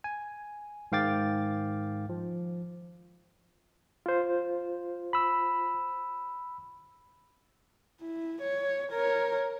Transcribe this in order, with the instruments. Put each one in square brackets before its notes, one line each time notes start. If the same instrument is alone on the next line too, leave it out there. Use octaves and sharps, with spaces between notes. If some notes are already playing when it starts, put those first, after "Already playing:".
[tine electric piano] G#5
G#2 D#3 F5 G5 D6 A6
F3
[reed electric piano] F4 C5
[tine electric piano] B5 E6
[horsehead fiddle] E4
C#5
A#4 C#5